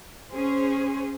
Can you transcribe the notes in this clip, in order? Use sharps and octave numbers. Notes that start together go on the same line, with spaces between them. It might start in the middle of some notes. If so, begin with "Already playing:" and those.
C#4 G#4 C5